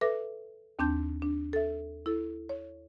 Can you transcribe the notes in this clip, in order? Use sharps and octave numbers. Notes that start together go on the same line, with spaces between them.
A4 B4 E5 D6 A#6
D#2 C4 D4 A5 G6
D4
A4 E5
E4 A4
C#5